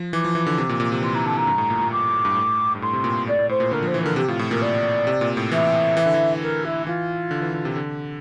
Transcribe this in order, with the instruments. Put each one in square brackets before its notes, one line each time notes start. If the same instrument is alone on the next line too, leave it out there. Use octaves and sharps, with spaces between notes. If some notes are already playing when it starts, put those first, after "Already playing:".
Already playing: [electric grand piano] F3
[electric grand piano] E3 [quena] D6
[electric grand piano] F3
E3
D3
C3
A#2
A#2
C3
[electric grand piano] E3 [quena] C6
[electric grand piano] E3 [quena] A#5
[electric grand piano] D3 [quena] A5
[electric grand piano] A#2 [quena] A#5
[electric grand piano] G2
A2
A#2
A#2
[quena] D6
[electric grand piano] G2
A2
G2
[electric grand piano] A2 [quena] C6
[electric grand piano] C3
A#2
[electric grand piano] A2 [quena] D5
[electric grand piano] A2
[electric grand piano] A2 [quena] C5
[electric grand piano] A#2
[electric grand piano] D3 [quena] A#4
[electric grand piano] F3
[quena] C5
[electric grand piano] E3
[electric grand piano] D3 [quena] A#4
[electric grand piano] C3 [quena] G4
[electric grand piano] A2 [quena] F4
[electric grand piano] A2
[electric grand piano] A#2 [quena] A#4
[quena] D5
[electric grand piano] C3
A#2
A2
[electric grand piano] E3 [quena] E5
[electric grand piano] E3
D3
E3
[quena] A#4
E4
[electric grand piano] E3 [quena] F4
[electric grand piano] D3
E3
D3
C3
D3